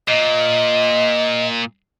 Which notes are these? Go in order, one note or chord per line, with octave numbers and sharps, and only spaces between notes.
A#2 D#5